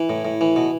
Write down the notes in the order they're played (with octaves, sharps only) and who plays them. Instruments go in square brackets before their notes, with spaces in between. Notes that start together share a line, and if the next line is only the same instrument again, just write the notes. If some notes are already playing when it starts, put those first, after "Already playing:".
Already playing: [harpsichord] E3 E4
A2
A2
E3
B2